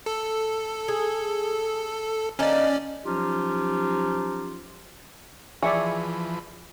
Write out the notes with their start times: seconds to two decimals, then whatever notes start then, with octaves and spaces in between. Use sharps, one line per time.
0.06 A4
0.88 G#4
2.39 D#3 A#3 C#4 D4 D5
3.06 F3 F#3 C#4 D#4 F4 G4
5.63 E3 F3 G#4 B4 D5 E5 C#6